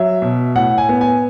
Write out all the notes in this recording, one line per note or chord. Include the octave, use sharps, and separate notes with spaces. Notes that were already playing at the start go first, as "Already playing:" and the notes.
Already playing: F#3 E5
B2
A2 F#5
G#5
B3
G#5